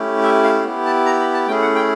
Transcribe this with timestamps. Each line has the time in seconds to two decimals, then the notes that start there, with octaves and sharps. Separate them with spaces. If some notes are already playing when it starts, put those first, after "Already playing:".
Already playing: A3 C#4 E4 G4
0.23 E5
0.44 F5
0.65 B3 E4 G4
0.85 A5
1.06 A#5
1.20 B5
1.34 A5
1.47 A3 C#4 E4 G#4 G5
1.62 F#5
1.75 G5